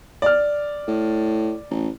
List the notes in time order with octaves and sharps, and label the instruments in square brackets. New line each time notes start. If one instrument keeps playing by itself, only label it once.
[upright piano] D5 F6
[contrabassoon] A2
A1